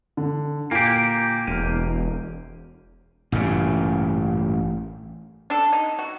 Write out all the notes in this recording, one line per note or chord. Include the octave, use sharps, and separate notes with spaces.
D3
A#2 A#3 G4 G#5 D7
E1 F6 D#7
A1 G2 A#2 C#3
D4 A4
D#4
F#4